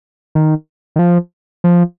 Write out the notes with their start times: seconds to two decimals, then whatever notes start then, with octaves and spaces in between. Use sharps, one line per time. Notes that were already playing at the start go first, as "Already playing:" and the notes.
0.35 D#3
0.96 D#3
0.99 F3
1.64 F3